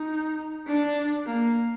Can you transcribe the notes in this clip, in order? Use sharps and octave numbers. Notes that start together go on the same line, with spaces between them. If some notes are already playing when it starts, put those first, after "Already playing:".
Already playing: D#4
D4
A#3